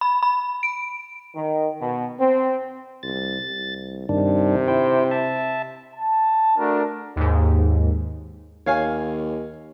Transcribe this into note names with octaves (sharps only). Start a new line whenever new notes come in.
B5
B5
D7
D#3
B2
C4
C2 A6
C2
G2 C3 D#3 D4
E4 C5 G5
E5 A5
A5
A3 D4 F#4 A#4
D#2 G#2
D#2 C#5 F5 G#5